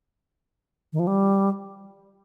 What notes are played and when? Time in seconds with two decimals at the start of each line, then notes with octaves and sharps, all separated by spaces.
0.93 D#3
0.99 F3
1.07 G3